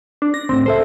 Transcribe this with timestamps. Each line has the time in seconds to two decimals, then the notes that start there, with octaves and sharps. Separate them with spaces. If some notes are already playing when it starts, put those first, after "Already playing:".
0.22 D4
0.34 A#6
0.49 D2 A2 C4
0.66 C#2 A4 C5 E5